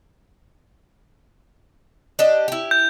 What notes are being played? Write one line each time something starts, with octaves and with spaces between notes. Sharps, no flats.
D4 G4 D#5
E4 G4
G6